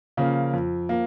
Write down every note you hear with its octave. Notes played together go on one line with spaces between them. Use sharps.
C#3 F3 A#3
F2
F3 A#3